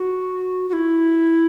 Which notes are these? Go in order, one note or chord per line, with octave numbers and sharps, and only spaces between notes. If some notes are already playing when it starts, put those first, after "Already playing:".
Already playing: F#4
F#4
E4